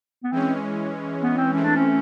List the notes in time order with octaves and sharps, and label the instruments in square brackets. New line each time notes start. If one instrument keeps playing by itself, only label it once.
[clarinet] B3
[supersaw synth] E3 G#3 C#4 [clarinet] C4
[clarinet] B3
C4
[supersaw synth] E3 A3 C4 [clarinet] C#4
[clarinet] D4
C#4